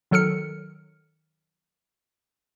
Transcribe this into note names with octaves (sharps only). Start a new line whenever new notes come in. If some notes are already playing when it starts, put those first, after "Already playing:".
D#3 F#3 A4 F6 C#7